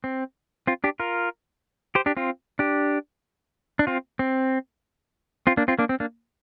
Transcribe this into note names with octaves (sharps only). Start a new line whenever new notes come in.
C4
C4 F4
D4 G4
F4 A#4
G4 C5
D4 G4
C4 F4
D4 G4
D4
C4 F4
C4
C4 F4
A#3 D4
C4 F4
A#3 D4
C4
A#3 D4